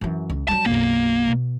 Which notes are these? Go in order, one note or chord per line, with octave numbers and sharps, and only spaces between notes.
F#2 E3
C#2
F#3 G3 A5
B1 F#2 A#3
B2